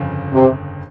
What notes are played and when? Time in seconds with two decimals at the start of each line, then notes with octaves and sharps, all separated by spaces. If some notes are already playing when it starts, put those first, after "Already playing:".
Already playing: G1 F2 C#3
0.32 C3